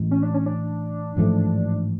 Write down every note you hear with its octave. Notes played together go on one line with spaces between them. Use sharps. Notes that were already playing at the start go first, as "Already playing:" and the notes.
Already playing: A1 A2 G#3
C#4
D4
C#4
D4
A1 G#2 F3 A3